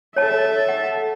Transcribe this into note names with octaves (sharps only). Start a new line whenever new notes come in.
A4 C#5 E5 A5
F#5